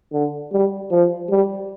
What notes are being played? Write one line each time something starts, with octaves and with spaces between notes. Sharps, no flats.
D3
G3
F3
G3